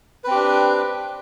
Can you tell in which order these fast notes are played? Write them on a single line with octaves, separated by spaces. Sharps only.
B4 C4 G4 D4